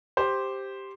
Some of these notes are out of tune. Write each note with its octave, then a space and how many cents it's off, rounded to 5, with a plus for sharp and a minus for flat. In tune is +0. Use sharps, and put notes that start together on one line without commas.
G4 +0 C5 +0